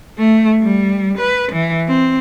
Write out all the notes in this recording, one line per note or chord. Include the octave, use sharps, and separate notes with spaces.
A3
G3
B4
E3
C4